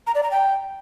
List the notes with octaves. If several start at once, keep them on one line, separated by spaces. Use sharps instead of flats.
A#5
D5
A#5
G5